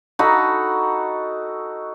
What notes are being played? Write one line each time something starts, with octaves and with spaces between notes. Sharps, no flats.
D#4 F#4 A4 B5